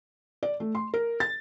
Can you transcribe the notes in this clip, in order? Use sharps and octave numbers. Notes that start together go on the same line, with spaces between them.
D5
A3
C6
A#4
A6